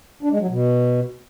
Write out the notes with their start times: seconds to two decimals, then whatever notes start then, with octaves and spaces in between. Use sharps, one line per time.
0.23 D4
0.32 G#3
0.40 F#3
0.49 B2